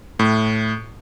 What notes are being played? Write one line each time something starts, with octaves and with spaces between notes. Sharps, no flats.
A2